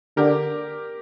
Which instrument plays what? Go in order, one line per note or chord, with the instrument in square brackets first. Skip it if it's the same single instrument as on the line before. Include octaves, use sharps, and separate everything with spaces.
[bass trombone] D3 [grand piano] G4 A#4